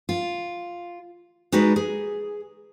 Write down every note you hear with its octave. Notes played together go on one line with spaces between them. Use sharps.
F4
G#3 D#4 F#4 B4 D5
G#4